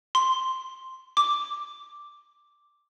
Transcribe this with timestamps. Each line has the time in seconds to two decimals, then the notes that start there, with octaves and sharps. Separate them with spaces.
0.15 C6
1.17 D6